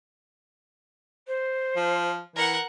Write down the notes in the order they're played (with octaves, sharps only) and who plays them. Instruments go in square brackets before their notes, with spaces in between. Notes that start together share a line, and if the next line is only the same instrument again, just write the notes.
[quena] C5
[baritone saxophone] F3
[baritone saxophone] E3 [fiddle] A#4 F#5